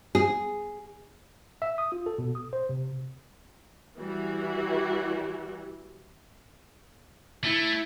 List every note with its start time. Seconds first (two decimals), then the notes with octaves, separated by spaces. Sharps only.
0.15 G#4
1.62 E5
1.78 D#6
1.92 F4
2.06 A4
2.18 B2
2.35 D#6
2.53 C5
2.69 C3
3.98 E3 G3 F#4
7.44 A3 E4